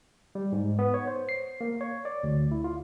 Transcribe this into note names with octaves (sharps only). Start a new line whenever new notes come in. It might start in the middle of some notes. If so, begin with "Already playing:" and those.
G3
G#2
B3
C#5
C5
C7
A#3
C#5
D5
D2
E4
F4